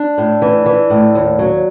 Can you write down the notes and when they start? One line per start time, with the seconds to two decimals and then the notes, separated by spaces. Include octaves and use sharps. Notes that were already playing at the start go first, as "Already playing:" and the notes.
Already playing: D4
0.18 A2
0.42 E3
0.66 E3
0.90 A2
1.15 D#2
1.39 F#3